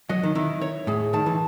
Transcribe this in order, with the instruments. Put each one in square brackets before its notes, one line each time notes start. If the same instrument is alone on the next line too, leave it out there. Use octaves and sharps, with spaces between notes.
[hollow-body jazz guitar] F#3 [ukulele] D#5
[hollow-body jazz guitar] D#3
[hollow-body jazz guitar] D#3 [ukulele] E4
[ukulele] C#5
[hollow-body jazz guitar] A2 [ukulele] G#4
[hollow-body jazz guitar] D#3 [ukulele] A5
[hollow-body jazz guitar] E3